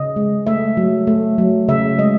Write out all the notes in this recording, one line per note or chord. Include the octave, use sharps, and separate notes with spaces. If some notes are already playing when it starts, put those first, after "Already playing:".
Already playing: C#3 D#5
G#3
A3 E5
F#3
A3
F#3
C#3 E5
G#3 D#5